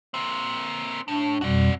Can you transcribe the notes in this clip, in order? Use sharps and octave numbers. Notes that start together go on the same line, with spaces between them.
A#3 C4
A2 D4
F2 B2 G3 F#4 D5